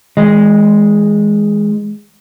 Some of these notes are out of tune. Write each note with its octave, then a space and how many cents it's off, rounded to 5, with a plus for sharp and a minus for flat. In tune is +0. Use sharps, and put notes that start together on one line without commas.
E3 -35 G#3 +0 D#5 +0